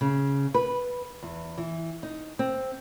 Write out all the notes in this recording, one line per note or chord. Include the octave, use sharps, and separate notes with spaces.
C#3
B4
E2
E3
D#4
C4